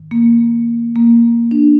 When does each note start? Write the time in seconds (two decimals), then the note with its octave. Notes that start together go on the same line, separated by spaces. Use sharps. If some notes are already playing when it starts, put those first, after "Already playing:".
Already playing: G#2 D#3
0.11 A#3
0.95 A#3
1.51 D4